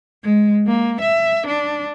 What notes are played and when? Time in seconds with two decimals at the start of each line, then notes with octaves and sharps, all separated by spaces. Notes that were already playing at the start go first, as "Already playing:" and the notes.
0.24 G#3
0.67 A#3
1.01 E5
1.47 D4